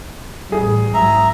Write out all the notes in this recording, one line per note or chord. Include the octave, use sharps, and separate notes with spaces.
A1 G3 G#4
G#1 F#3 E5 A#5